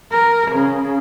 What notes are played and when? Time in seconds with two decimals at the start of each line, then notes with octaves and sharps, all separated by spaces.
0.11 A#4
0.52 C#3